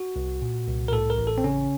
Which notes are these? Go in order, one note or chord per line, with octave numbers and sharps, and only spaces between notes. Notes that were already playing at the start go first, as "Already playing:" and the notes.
Already playing: F#4
C2
A#2
C2
A#4
A2 A4
A#4
A1
A4
C4
C#3 C#4